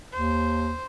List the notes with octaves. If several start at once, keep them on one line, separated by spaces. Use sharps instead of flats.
D#2 C5